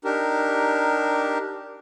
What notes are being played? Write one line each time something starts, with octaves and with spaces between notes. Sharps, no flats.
D4 D#4 G4 A#4